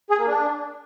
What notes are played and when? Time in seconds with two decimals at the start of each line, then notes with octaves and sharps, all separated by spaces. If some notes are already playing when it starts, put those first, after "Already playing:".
0.10 G#4
0.19 A#3
0.27 D4